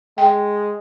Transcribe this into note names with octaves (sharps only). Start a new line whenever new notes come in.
G#3 G5